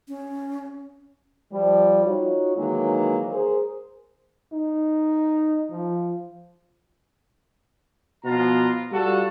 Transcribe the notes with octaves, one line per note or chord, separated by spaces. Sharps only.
C#4
F3 G3
D#4 F4 F#4 C#5
D#3 E3 F#3 G#3 A#3
G#4 A#4 C5
D#4
F3
B2 F3 B3 F4 A#5
G3 F4 F#4 A4